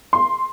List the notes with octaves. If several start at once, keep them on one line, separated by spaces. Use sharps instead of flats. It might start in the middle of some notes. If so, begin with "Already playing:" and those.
C6